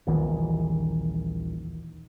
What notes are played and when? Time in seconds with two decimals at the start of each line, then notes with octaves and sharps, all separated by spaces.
0.07 D#1 A#1 D#3 E3